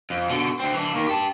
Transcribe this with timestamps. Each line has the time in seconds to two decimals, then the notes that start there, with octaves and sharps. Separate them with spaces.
0.10 F2
0.30 B2 D3
0.59 D2 C4
0.74 E3 D4
0.95 D#3 A#3
1.07 G4 A5